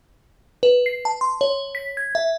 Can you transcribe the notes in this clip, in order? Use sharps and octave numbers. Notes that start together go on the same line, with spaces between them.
B4
C7
A5
C6
C#5
B6
G#6
E5